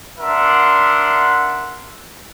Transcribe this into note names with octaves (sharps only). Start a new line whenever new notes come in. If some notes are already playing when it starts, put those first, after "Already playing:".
D4 A#4 E5 F#5 C6